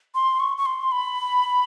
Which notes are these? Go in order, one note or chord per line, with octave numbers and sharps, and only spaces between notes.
C6
C#6
C#6
C6
B5